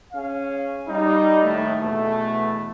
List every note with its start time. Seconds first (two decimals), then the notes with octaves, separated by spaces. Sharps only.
0.13 C#4 G#4 F5
0.88 G3 D#4
1.43 D#2 A2 A3
1.80 E2 B2 A3